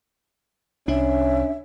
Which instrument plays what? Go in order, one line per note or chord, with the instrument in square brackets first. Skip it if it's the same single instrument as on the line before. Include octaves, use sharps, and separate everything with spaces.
[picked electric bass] C2 [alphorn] C#4 [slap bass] D4 [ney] E5